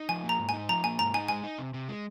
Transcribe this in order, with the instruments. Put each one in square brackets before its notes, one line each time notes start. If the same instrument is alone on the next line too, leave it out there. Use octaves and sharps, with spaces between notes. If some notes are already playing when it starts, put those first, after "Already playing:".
Already playing: [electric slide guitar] D#4
[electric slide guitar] F3 [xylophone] G#5
[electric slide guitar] A#3
[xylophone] A#5
[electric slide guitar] G#2
[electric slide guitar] D#4 [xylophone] G#5
[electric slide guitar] F3 [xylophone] A#5
[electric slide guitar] A#3 [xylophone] G#5
[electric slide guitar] G#2 [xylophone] A#5
[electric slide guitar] D#4 [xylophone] G#5
[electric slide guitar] G#3 [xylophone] G#5
[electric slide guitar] D#4
C3
C3
G#3